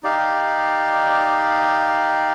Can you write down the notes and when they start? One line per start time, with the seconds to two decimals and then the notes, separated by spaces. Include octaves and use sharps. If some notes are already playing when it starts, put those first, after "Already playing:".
0.03 D#4 G4 D5 F5